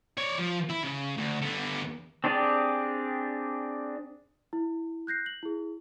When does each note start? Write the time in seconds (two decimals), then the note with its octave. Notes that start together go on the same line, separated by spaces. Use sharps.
0.17 C#5 D5
0.38 F3
0.69 E4
0.84 C#3
1.17 D2
1.41 D3 B3
2.24 C4 D4 G4 G#4 D5
4.53 E4
5.07 F#6 G6 A#6 C7
5.26 F#7
5.43 E4 G#4